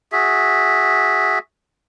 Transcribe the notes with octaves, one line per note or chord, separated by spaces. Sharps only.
F#4 G#4 E5